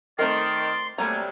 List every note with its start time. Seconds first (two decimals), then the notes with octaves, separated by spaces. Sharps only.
0.19 D#3 A3 C4 A#4 D5 C6
0.98 C3 F#3 G3 A3 A#3 G#5 A#5